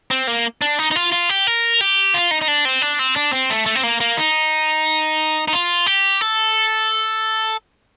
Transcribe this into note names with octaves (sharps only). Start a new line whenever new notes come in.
C4
A#3
D4
D#4
D#4
F4
F4
G4
A#4
G4
F4
D#4
D#4
D4
C4
D4
C4
D4
C4
A3
A3
C4
A#3
A#3
D#4
D#4
F4
G4
A4